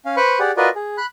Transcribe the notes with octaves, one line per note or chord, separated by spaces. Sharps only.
C#4 F5
B4 C5 B5 C#6
G4 G#4 D5 F#5
F4 F#4 A#4 B4 D5 D#5
G#4
B5 F#6